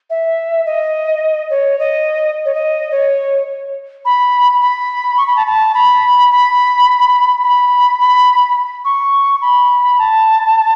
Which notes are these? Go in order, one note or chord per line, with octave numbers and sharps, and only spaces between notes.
E5
D#5
C#5
D#5
C#5
D#5
C#5
B5
B5
C#6
B5
A5
A5
B5
B5
B5
B5
C#6
B5
A5